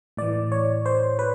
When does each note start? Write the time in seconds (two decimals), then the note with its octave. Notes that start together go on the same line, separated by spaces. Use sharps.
0.17 A2 E3 D5
0.52 C#5
0.86 C5
1.19 B4